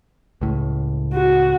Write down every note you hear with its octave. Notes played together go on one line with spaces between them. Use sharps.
C#2 A2
F#4